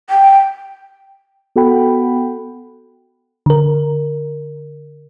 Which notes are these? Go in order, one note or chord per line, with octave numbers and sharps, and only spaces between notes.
G5
B3 F#4 A4 F#5 G5 B5
D3 A#4